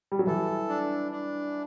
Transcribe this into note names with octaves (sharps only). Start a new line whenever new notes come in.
G3
F#3
E3 A4
D4
D4